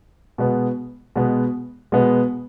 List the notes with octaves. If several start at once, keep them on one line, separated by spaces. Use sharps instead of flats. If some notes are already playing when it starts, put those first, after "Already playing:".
B2 G#3 B3
B2 G#3 B3
B2 G#3 B3